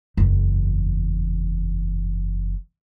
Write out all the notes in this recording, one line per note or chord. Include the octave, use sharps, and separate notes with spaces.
F#1 E2